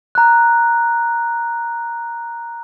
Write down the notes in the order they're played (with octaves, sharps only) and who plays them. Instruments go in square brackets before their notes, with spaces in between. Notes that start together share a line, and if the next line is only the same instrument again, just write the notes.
[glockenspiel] A#5 F#6